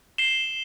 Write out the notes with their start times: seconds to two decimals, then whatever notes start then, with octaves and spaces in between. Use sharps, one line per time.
0.18 C7 E7 G7